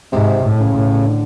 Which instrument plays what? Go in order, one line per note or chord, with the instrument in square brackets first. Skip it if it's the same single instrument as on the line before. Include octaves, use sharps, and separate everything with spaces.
[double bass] G#2 [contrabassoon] C3
[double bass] A2
[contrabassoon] C#3
[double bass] A2
[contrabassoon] D3